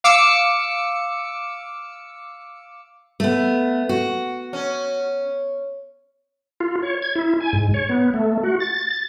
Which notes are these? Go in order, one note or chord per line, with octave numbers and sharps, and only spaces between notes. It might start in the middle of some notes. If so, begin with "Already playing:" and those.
F5 D6 E6 C#7
A3 B3
F#4
C#4
F4
C#5
G#6
E4
G#5
G#2
C#5
B3
A3
F#4
A6
A6